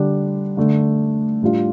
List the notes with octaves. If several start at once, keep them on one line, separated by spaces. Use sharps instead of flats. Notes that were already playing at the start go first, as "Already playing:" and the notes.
Already playing: D3 G3 D4
D3 A3 D4
A2 G3 D4 F4